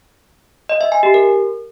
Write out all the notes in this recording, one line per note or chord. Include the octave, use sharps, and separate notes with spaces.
D#5
E5
G#5
G4
A#4